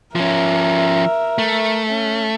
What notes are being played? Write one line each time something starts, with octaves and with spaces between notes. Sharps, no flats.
F3 C#4 A#4 E5
A3
C#4